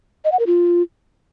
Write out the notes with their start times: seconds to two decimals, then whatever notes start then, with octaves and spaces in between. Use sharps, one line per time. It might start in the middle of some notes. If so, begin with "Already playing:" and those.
0.25 D#5
0.32 F#5
0.39 A#4
0.47 F4